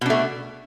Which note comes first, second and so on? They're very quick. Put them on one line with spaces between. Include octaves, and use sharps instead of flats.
B2 D4 A3